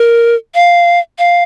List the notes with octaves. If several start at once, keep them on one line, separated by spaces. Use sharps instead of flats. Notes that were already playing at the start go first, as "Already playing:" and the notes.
Already playing: A#4
F5
F5